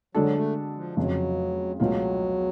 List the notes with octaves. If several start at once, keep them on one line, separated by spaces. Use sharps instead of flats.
D3 F#3 G#3 D4 F#4 A4
A3
F3
F1 F2 C#3 F#3
C#2 B2 F#3 A3 F4